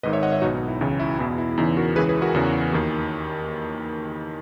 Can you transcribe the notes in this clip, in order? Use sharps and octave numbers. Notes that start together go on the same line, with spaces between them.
G#1 G#2 D#3 B4 D#5
C#5 E5
D#5 F#5
C#5 E5
B1 B2 D#4 F#4
D#4
E4
C#2 C#3 E3 E4
E4
E2 B2 E4
E4
E2 C#3 E3 D#4
F#4 A#4
C#2 C#3 E3 G#4 B4
G#4 B4
F#4 A#4
E2 C#3 E3
D#2 D#3